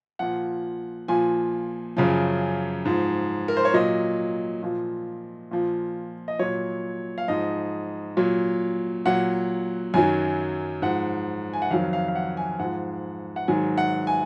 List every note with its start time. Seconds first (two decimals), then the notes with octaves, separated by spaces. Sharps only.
0.19 A#2 F3 F#5
1.08 A#2 F3 G#5
1.97 F#2 C#3 F3
2.85 G#2 F3
3.48 A#4
3.57 C5
3.65 C#5
3.74 A#2 F#3 D#5
4.63 A#2 F3
5.51 A#2 F3
6.28 D#5
6.39 A#2 F#3 C#5
7.18 F5
7.28 G#2 F3 D#5
8.17 A#2 F#3
9.05 A#2 F#3 F#5
9.94 F#2 D#3 F#3 G#5
10.82 G#2 F3 F#5
11.53 G#5
11.62 F#5
11.71 F2 D#3 F#3 F5
11.93 F5
12.08 F5
12.15 F#5
12.37 G#5
12.60 G#2 F3 F#5
13.36 F#5
13.48 G#2 D#3 F#3 G#5
13.78 F#5
14.07 G#5